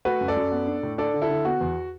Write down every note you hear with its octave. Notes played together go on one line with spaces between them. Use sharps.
A3 F#4 B4
F#2
A4 D5
F#2
B3
D4
A2
D4 A4 D5
D3
E4 A4
D3
B3 F#4
E2